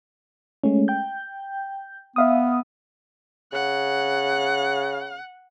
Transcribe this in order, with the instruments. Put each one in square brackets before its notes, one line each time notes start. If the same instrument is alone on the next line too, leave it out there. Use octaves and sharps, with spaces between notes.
[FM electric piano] G#3 A3 C#4
G5 G6
[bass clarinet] B3 [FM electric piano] E5 F5 D#6
[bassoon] C#3 [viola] F#5